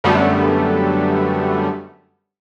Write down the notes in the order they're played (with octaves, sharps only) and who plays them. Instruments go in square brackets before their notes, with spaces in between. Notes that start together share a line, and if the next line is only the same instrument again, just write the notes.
[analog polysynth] F#2 D3 G3 A3 B3